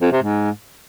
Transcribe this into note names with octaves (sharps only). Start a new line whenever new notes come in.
F2
C3
G#2